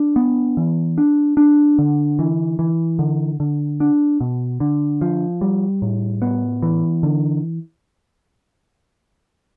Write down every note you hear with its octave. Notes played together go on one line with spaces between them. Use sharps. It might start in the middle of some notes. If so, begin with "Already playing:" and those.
Already playing: D4
B3
E3
D4
D4
D3
E3
E3
D3
D3
D4
B2
D3
F3
G3
A2
B3
E3
D3